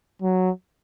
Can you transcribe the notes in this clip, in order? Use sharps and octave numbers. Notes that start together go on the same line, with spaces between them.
F#3